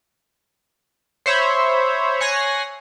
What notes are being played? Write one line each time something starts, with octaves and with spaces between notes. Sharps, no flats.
C5 C#5 E5 B5
C#5 G#5 F#6 A#6 C7